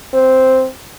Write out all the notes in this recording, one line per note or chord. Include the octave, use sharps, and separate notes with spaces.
C4